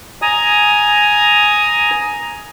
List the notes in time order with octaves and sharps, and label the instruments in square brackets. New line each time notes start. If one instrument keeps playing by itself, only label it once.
[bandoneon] G#5 A#5 D#6